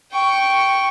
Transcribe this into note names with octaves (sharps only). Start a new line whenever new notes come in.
G5 C#6